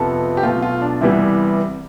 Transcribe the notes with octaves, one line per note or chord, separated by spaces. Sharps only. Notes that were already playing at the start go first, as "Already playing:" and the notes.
Already playing: F2 C3 F3 B3 A4
G4
B1 B2 A3 F4
F4
D4
C2 C3 E3 G3 B3 E4